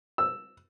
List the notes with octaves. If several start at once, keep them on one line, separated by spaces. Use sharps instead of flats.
E6